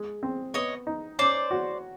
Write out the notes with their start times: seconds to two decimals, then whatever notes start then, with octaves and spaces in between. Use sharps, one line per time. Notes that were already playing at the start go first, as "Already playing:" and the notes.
Already playing: G#3
0.23 C4
0.54 B3 C#5 D#5
0.87 D#4
1.19 C#4 C5 D5
1.51 F#4